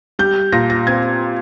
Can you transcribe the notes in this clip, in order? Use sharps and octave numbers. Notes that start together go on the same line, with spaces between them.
G3 G6
A#2 A#6
A#6
C4 G#6